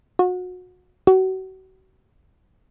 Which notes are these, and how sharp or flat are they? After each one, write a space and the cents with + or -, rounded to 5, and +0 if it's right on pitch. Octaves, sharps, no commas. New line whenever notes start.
F#4 -30
F#4 +35